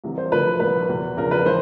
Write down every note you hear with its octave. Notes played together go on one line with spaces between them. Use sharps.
C2 C3 E3
C5
D2 D3 F3 B4
C2 A#2 F3 B4
E2 B2
E2 C#3 F3 A#4
B4
E3 C5